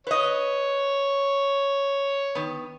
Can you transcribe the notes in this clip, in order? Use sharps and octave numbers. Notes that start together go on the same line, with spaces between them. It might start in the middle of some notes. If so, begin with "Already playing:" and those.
B4 C#5 D#5
D#3 B3